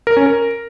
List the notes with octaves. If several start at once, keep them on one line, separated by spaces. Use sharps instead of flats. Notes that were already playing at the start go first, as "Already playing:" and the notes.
A#4
C#4
A#4